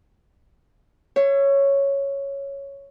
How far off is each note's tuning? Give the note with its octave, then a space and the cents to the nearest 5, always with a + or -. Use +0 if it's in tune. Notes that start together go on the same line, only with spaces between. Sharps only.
C#5 +0 E5 +40